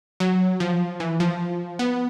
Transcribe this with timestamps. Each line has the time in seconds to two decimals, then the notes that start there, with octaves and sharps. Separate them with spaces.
0.20 F#3
0.60 F3
1.00 E3
1.20 F3
1.79 B3